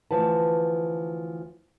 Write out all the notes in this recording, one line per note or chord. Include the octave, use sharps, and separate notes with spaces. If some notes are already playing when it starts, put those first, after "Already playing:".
D2 C#3 E3 F3 B4 A5